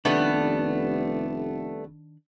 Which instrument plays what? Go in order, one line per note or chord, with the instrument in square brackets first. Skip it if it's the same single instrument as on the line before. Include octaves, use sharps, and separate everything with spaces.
[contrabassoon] F1 [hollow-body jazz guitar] D#3 D4 [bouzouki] G3 A3 B3